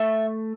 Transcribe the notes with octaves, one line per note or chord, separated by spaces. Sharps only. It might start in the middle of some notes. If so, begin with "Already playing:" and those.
Already playing: A3 E5